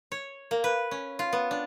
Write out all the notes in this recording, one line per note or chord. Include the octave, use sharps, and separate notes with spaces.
C#5
A#3
B4
C#4
F4
B3
D4